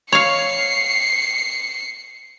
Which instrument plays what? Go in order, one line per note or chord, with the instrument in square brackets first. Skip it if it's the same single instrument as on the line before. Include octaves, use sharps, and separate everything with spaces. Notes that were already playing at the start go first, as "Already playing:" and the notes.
[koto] C#5 F5 [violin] C7 C#7